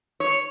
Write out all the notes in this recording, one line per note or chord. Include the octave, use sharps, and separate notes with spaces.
C#5